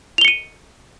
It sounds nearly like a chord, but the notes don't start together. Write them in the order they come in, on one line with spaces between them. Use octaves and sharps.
F7 G7 C#7 D#7